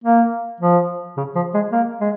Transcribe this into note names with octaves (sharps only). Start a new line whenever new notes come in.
A#3
F3
C#3
F3
G#3
A#3
G#3